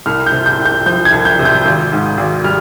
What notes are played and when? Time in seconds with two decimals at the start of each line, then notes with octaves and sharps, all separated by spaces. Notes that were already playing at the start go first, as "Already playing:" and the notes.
0.06 C2 F6
0.26 G6
0.32 C3
0.46 G6
0.59 C2
0.66 G6
0.86 F3 G6
1.05 G#6
1.12 C2
1.25 G6
1.39 C3
1.45 G6
1.65 G#1
1.92 G#2
2.18 G#1
2.44 G3 F6